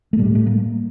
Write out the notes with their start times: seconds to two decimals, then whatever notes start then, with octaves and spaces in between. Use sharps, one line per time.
0.13 A3
0.19 A2 G3
0.35 A3
0.47 A#3